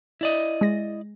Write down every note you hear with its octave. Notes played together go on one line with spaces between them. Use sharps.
E4 D5 D#5
G#3 A#6